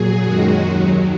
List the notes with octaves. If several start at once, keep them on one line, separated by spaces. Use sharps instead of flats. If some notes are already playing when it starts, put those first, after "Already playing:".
Already playing: A#2 F#3 G#4
F#2 D#3 G#3 F#4
D#2 D#3 F#3